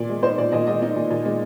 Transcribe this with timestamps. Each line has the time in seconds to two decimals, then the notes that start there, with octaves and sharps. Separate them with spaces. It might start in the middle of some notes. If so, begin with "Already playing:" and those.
Already playing: A#2 D5
0.09 G#3
0.23 D#4 C5
0.38 A#2 D5
0.52 A#2 D#5
0.67 G#3 D#5
0.82 D#4
0.96 A#2
1.10 A#2
1.25 G#3